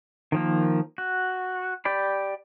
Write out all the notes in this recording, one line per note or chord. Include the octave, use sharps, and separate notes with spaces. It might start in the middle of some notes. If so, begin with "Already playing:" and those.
D#3 F3 A#3
F#4
G4 D5 B5